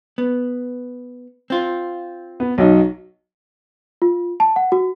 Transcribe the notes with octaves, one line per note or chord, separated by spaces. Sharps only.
B3
C4 F4
B3
B1 F#3 D#4
F4
A5
F#5
F#4